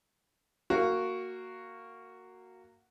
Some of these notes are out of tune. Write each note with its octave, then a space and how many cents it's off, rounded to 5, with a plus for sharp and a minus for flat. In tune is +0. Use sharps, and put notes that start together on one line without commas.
A#3 -15 F#4 +0